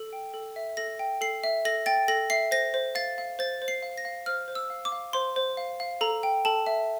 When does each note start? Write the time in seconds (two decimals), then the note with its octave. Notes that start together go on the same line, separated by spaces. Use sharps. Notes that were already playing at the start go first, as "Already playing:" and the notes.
Already playing: A4
0.13 G5
0.34 A4
0.56 E5
0.77 A4 A#6
0.99 G5
1.21 A4 C7
1.44 E5
1.65 A4 A#6
1.86 G5 A6
2.08 A4 A#6
2.30 E5 C7
2.51 C5 A#6
2.74 C5
2.95 F5 A6
3.18 F5
3.39 C5 A6
3.62 C5
3.68 C7
3.82 F5
3.97 A#6
4.05 F5
4.26 C5 F6
4.48 C5
4.55 E6
4.70 F5
4.85 D6
4.92 F5
5.13 C5 C6
5.36 C5
5.57 F5
5.80 F5
6.01 A4 A#5
6.23 G5
6.45 A4 A5
6.66 E5